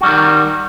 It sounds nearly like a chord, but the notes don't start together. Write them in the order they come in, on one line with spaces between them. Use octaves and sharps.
F#4 G3 D#3